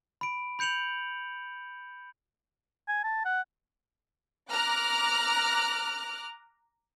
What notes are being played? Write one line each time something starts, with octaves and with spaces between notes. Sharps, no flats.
B5 D7
B5 G6 C#7 F7 F#7
G#5
A5
F#5
A#5 D6 F6 F#6